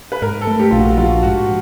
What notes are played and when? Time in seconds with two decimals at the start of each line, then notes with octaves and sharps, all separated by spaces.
0.12 B4
0.22 G#2 A#4
0.41 A4
0.47 A3
0.59 G4
0.71 A#1 F4
0.79 F#4
0.91 F#4
0.98 F3 F4
1.23 G#2 F#4